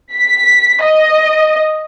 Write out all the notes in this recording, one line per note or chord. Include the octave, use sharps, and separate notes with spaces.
B6
D#5